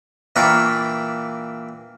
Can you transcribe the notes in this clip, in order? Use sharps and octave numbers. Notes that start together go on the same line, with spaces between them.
A#2 E3 A#3 D4 G5 C#6